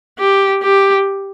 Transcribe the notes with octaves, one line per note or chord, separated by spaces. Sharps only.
G4
G4